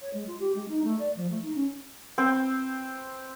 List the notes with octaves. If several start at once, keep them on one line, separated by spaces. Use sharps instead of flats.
C#5
G#3
F4
G4
G#3
D#4
A3
D5
F3
A3
D#4
C#4
C4